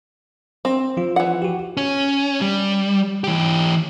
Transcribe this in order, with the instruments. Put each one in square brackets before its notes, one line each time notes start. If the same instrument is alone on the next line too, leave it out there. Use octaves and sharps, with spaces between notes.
[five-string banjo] C4
[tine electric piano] F3 F4
[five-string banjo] E3 F#5
[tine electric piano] F#4 G4
[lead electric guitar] C#4
G3
E3 G4